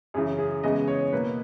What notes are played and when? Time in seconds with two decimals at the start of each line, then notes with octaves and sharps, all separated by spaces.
0.14 F#2 C#3 E3 G#4
0.39 G#4
0.63 C#3 E3 G#3 B3 D#5
0.88 C#5
1.13 B2 A#3 B4